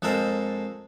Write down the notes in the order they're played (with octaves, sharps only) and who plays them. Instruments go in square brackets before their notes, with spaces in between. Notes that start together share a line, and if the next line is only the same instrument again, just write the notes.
[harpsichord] F2 G#3 A4 A#4 C5